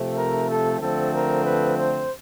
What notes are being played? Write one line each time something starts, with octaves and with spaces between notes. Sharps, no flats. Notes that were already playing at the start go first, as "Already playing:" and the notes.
Already playing: C3 F3 A3 C4
A#4
A4
D3 F3 A3 C4 A4
A#4
B4
C5